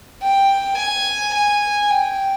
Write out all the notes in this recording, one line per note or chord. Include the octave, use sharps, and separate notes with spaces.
G5
G#5
G#5
G5